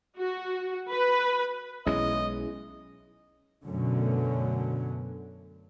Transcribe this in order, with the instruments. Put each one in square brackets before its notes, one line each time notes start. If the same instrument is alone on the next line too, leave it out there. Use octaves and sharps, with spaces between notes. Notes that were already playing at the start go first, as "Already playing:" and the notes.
[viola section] F#4
B4
[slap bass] B1 G#3 [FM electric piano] C#4 E4 G#4 [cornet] D#5
[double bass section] F#2 B2 D3 F#3 A3 C#4